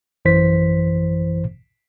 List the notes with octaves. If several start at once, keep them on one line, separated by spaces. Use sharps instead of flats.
A1 F#2 E3 C5 B6